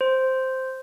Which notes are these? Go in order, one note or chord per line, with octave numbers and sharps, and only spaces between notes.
C5